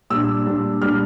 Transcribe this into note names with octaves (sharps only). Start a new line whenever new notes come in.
A#2 G3 D4 E6
A#2 G3 D4
A#2 G3 D4 F6